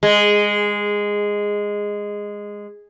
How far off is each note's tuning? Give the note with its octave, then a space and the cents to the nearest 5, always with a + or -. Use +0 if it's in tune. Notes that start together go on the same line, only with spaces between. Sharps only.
G#3 -10